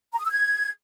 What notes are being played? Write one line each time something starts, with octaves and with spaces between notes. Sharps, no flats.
A#5
D#6
E6
G#6